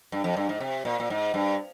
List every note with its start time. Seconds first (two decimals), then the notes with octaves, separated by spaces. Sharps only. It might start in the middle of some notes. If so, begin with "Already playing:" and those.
0.12 G2
0.24 F2
0.37 G2
0.49 G#2
0.61 C3
0.85 A#2
1.00 A#2
1.10 G#2
1.34 G2